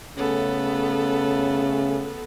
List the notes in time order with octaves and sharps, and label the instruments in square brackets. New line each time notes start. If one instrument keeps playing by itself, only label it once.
[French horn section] C#3 A3 C#4 [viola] B3 A4